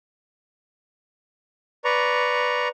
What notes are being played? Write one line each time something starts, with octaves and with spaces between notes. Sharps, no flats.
B4 D5 A#5 C#6